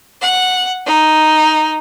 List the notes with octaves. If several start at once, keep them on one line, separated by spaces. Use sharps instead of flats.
F#5
D#4